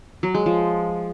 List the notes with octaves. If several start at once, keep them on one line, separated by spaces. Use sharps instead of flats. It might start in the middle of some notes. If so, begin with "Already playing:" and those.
F#3
G#3
F3